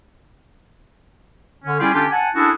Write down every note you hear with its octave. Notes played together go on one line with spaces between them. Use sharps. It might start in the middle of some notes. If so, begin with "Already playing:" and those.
D3 C#4
G3 C#4 E4 F4 G4 G#4
D3 C#4 D4 F4 G4
F#5 G#5 A5
C#4 D4 E4 F#4 G#4 A4